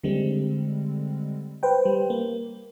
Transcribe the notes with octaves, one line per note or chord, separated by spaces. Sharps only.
D3 G3 G#3 C4
B4 C5 G5
G3
A#3